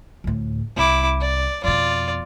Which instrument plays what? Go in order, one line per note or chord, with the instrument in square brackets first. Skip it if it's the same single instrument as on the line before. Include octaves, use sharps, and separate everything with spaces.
[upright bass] D2 A2
[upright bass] C2 C4 [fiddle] E4 D6
[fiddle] D5
[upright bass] F2 B2 [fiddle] F4 D5